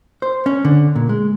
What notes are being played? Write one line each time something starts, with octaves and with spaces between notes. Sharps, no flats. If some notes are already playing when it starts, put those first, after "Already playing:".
C5
C#4
D3
A#2
G#3